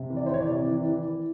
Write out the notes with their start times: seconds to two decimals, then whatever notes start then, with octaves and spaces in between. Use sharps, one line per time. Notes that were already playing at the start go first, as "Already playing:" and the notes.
Already playing: C3
0.10 E3
0.17 D5
0.26 C5
0.29 E3 C#5
0.42 D5
0.48 C3
0.68 E3
0.86 E3
1.06 E3